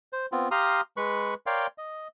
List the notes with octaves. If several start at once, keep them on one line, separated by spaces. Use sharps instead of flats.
C5
B3 C4 F4
G4 F5 A#5 C6 D#6 F6
G#3 B4 B5 C#6
A#4 C#5 D5 F5 G5 C6
D#5